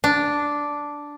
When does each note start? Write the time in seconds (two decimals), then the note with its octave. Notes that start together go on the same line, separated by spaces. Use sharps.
0.04 D4